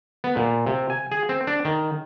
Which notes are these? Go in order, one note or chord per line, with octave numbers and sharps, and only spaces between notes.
B3
A#2
C3
G#5
G#4
C4
D4
D#3